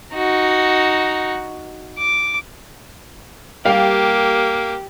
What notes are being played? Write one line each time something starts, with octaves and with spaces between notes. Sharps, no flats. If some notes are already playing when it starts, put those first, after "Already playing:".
D#4 F#4
D6
G3 A#3 G4 F5 G5